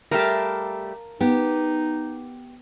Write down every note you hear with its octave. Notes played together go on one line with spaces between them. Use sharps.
G3 A3 G4 A#4 F5 A5
B3 D#4 G4